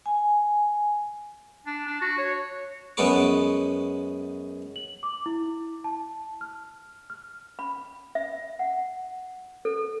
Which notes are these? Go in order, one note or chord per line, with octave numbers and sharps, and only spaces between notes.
G#5
D4
D4
F#4
C#5
F#2 G#3 B3 A4 C#6 D6
F#7
D6
E4
A5
F6
F6
B5
E5
F#5
A4